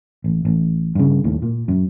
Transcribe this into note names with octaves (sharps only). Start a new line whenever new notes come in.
A1
A1
G2 C#3
D#2 A2
A#2
F#2